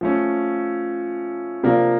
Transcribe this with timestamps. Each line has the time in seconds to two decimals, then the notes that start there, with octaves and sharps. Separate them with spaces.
0.01 F3 A3 C#4
1.63 C3 F3 A#3 D4